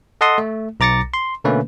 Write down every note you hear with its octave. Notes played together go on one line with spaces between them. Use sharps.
A4 D#5 F#5 A5 C6 D#6
A3
B1 A#5 D6 A6 A#6 C#7
C6
B2 D3 A3 A#3 C#4 B4